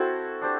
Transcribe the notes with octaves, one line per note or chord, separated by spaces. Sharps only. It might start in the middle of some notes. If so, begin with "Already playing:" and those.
Already playing: C4 E4 F#4 A4 C5
D4 G4 C5